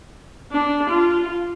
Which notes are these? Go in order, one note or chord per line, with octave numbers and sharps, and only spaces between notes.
D4
F4